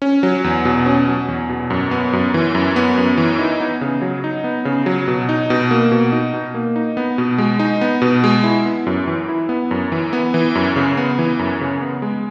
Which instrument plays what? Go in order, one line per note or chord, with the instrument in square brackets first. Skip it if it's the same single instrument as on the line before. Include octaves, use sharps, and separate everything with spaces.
[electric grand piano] C#4
F#3
E2
B2
C#4
F#3
E2
B2
F#2
B3
F#2
E3
F#2
B3
F#2
E3
D#4
B3
C#3
F#3
D#4
B3
C#3
F#3
B2
D#4
B2
A#3
B2
D#4
B2
A#3
D#4
B3
B2
G#3
D#4
B3
B2
G#3
E4
B3
F#2
E3
E4
B3
F#2
E3
B3
E3
F#2
C#3
B3
E3
F#2
C#3
B3
G#3